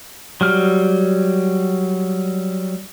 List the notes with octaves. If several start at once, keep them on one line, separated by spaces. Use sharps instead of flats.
F#3 G3 F6